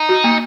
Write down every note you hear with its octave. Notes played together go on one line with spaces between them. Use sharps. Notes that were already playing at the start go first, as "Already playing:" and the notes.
Already playing: D#4
F#4
A#3